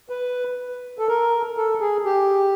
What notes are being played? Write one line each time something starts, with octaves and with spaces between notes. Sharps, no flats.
B4
A4
A#4
A4
G#4
G4